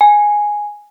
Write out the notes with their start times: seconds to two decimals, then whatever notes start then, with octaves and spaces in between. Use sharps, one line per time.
0.01 G#5